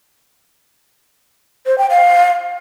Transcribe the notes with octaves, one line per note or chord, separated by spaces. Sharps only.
C5
G5
F5